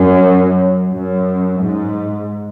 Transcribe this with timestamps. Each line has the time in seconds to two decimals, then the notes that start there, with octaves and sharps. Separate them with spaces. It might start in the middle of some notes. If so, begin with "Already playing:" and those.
Already playing: F#2
0.91 F#2
1.59 G#2